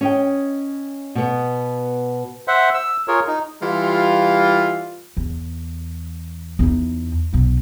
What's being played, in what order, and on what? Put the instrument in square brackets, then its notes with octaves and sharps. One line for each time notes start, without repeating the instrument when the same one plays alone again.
[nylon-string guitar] C#4 D#5 G5
B2 B3
[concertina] C5 E5 F#5
E6
F4 G#4 A#4 C#5
D#4
[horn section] E3 G3 F4
[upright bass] E2
E2 D#4
B1 D#4